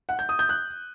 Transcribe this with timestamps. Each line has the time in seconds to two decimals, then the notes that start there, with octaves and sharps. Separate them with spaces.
0.09 F#5
0.19 G6
0.29 D#6
0.39 G6
0.49 F#6